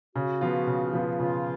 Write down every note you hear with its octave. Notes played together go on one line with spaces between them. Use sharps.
C#3 F#4
F3 B3 F4
C#3
F3 B3 F4
C#3 F4